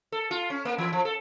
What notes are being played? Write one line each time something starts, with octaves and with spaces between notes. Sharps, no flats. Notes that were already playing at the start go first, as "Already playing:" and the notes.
A4
F4
C#4
A#3
E3
F3
A4